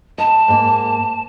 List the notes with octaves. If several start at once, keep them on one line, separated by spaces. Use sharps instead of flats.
D#5 A5
G#2 A#3